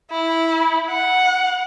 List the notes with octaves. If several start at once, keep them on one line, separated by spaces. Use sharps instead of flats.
E4
F#5